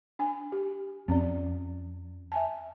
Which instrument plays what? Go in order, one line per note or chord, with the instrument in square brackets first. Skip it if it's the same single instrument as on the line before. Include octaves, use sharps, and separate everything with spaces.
[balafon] D4 G#5
G4
[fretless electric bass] F2 [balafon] C4 C#4 D5
[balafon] E5 G#5 A5